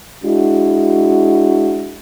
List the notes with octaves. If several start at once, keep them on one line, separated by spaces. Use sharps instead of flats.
G#3 D4 E4 F#4